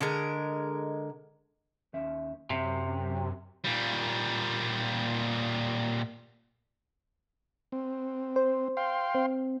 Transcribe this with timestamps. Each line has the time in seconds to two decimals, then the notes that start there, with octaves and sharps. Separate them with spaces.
0.01 D3 G#3 A#4
1.94 D#2 C#4 E5
2.50 F#2 C3 E5
3.65 A#2 G3
7.72 C4
8.36 C5
8.77 F5 G5 C6
9.15 C4